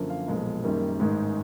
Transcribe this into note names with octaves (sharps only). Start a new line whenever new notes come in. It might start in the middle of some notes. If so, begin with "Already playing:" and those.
Already playing: F#2 D3 F3 A#3
F5
B1 A#2 F3 G#3
F#1 F#2 D#3 G3 A#3
A1 G#2 D#3 G#3